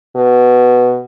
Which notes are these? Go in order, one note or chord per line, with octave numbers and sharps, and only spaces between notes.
B2